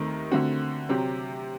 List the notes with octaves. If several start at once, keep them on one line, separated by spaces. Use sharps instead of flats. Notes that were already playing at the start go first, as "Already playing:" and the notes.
Already playing: D#2 D#3 A3 C4 D#4
D3 A3 C4 F#4
C3 F#3 C4 G4